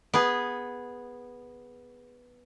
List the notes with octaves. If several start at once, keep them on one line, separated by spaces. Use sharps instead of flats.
B3 G#4